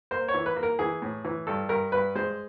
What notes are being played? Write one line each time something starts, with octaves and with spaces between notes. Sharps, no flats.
A#3 C5
C#5
E3
B4
A#3
A#4
E3 G#4
A2
E3
G2 A4
G2 A#4
G2 B4
G#3 C5